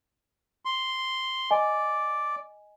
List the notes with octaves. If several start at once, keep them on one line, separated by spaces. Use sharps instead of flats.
C6
D5 D#5 G#5